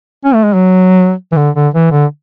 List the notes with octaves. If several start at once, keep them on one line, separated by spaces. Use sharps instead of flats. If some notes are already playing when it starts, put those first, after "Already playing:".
C#4
A3
G#3
F#3
E3
D3
D3
E3
D3